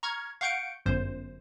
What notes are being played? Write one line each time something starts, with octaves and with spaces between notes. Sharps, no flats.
A#5 C#6 F6 G#6
F5 F#5 C#6 G6 C#7 D7
G1 F#2 C5